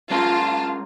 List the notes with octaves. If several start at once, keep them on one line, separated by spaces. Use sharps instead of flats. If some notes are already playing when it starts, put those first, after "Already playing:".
G#3 C#4 F4 A#4 A5